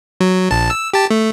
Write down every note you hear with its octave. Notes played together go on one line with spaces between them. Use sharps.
F#3
A#1 A5
E6
G4 A5
A3